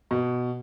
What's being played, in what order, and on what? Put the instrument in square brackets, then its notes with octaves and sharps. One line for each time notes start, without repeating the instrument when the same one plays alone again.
[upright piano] B2